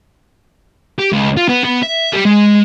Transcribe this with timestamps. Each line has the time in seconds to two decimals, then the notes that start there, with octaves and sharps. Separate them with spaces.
0.99 G4
1.12 C#2
1.37 F4
1.49 B3
1.64 B3
1.83 E5
2.13 G3
2.25 G#3